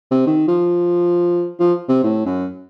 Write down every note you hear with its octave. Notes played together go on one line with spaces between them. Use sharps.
C3
D#3
F3
F3
C3
A2
F#2